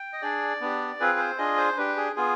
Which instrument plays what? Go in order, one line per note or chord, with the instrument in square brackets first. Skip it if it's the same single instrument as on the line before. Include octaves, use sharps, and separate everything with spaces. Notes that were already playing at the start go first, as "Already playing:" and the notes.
Already playing: [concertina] G5
D#5
D4 G#4 D5
B3 D4 G4
C4 F4 G#4 B4
C5
D4 F4 G#4 D#5
C5
D4 G4 B4
G#4
B3 F4 G#4